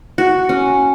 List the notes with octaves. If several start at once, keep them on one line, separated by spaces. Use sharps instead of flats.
F#4
C#4